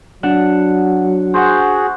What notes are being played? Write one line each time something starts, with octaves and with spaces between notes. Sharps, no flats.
F#3 D4 F#5
F#4 G#4 C5 F#5